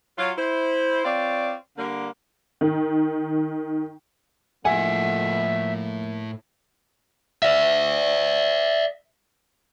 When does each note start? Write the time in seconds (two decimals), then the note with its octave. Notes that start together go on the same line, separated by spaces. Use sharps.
0.18 F#3 F4
0.37 E4 C5
1.05 C4 F4 C#5 D5
1.78 D3 G3 A#3
2.61 D#3
4.65 A2 F3 A3 A#3 E5 F#5 G#5
7.43 D5 E5